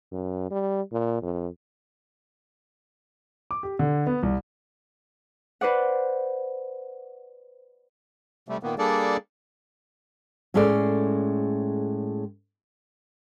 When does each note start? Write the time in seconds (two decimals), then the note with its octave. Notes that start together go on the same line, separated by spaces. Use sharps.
0.12 F#2
0.51 G3
0.92 A#2
1.22 F2
3.51 D6
3.63 G4
3.79 D3
4.07 B3
4.23 C2
5.61 B4 C5 D5 F#5
8.49 C3 G3 A3
8.63 A#2 D#3 A#3 B3
8.78 G3 A#3 D4 G#4 A4 D5
10.54 A2 G#3 C#4 G#4 A4 D5